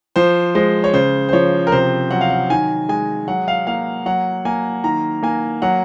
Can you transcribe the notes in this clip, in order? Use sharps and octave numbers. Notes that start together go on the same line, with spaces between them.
F3 C5
G#3 C5
C#5
C#3 C5
C5
F3 C#5
A#4
C3 C5
F#3 F#5
F5
F#5
D#3 G#5
G#3 G#5
F#3 F#5
F5
A#3 F5
F#3 F#5
A#3 G#5
D#3 A#5
A#3 G#5
F#3 F#5